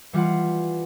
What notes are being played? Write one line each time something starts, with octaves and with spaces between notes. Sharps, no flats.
E3 G3 F4 F#5